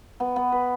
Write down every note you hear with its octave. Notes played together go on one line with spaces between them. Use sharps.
B3
B3
B4